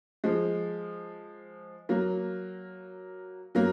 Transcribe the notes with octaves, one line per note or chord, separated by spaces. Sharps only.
F3 G#3
F#3 A#3
F#3 A#3